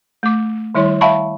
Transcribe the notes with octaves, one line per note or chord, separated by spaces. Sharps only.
A3 D6
D#3 G3 E4 C#5 C6
E5 F5 G5 A5 B5 C#6